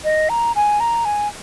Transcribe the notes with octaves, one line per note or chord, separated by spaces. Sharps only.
D#5
A#5
G#5
A#5
G#5